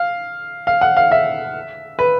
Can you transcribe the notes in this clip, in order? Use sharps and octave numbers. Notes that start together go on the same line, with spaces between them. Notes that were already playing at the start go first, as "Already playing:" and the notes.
Already playing: F5
F5
F#5
F5
E5
B4